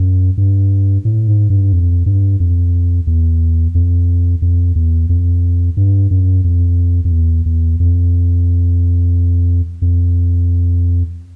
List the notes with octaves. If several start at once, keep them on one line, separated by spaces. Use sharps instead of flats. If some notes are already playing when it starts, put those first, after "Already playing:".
Already playing: F#2
G2
A2
G#2
G2
F2
G2
F2
E2
F2
F2
E2
F2
G2
F#2
F2
F2
E2
E2
F2
F2